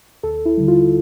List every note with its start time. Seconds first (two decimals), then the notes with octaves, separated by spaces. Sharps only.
0.23 D#2 A4
0.45 E4
0.57 D3 G3
0.68 F4